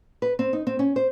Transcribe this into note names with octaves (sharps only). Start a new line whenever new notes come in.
B4
C4
D#4
C4
C#4
C5